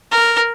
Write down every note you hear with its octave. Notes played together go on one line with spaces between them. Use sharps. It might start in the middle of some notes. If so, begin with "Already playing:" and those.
A#4